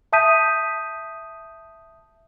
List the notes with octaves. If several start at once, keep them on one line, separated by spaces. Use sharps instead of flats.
E5 A5 D#6 G6 B6 D#7